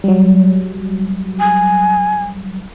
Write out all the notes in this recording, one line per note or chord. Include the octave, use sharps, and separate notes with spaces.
F#3 G3
G#5